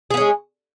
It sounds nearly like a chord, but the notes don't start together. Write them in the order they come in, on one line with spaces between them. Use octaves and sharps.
G#4 B3 C#4 G#3